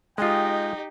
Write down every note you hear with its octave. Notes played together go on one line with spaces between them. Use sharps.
G#3 D#4 F4 G4 D#5 G5